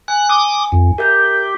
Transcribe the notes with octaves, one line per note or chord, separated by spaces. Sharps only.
G#5 F#6
D6 D#6
F2
G4 A#4 E5 G6